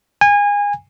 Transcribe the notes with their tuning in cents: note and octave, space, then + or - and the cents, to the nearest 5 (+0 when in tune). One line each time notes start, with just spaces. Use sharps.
G#5 -25